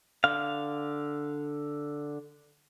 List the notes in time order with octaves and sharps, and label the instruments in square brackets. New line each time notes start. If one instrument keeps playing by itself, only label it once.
[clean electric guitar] D3 F5